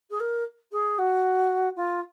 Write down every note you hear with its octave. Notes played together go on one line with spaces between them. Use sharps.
G#4
A#4
G#4
F#4
F4